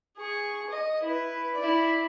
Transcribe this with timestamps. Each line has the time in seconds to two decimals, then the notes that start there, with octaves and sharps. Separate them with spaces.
0.18 G#4 C#6
0.70 D#5
1.03 E4 B4
1.55 E4 D5